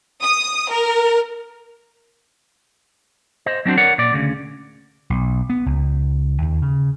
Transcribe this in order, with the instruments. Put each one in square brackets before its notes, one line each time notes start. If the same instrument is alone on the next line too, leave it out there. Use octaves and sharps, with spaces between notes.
[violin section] D#6
A#4
[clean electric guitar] C5 D#5
F#3 C4 D4 F#4 C5
A#4 C#5 D5 F#5
A#2 D5
D2 C#3
[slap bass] B1
B3
C#2
D#2
C#3